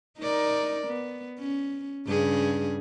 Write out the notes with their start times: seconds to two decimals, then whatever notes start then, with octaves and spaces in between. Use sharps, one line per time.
0.19 D#4 A#4 D5
0.88 B3
1.39 C#4
2.07 G2 C#3 G#4